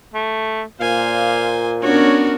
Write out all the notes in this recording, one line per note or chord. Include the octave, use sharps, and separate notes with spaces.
A3
A#2 C5 F5 G#5
B3 C#4 D4 F#4 A#4 C#5